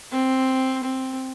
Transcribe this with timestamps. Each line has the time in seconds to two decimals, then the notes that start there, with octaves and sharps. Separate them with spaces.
0.12 C4
0.83 C4